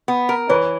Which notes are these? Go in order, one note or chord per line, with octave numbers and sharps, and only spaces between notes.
B3
A#4
E3 B4 C#5